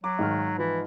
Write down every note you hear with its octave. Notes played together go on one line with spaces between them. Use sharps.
F#3 D6
G#1 G#2 D#3 F6
E3 F3